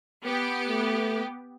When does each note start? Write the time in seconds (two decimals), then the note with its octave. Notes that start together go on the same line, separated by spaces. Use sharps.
0.24 B3 G4
0.68 A3